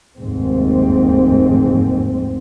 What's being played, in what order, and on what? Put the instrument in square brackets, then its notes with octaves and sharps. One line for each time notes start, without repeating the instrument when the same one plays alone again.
[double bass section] F1 D#2 G#2 C4